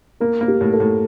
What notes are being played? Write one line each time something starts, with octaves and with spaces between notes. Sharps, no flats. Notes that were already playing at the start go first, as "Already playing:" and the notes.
A#3 A#4
A#3
G4
A2
A4
A2